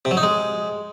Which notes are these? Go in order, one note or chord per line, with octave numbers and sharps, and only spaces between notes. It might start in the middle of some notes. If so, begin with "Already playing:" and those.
C3
F#3
D#4
G#3